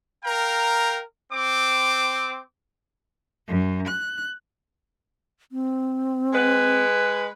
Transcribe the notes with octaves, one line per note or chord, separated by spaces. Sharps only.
A#4 F5 G5 A#5
C4 D6
F#2
F#6
C4
G#3 B4